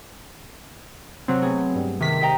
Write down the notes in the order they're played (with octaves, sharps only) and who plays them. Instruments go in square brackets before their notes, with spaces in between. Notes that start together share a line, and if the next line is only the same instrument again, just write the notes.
[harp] C3 [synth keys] F#3 C4
[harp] A3 B3 G#4
[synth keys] G2
C3 D#3 B6
[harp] D#5 G5 A#5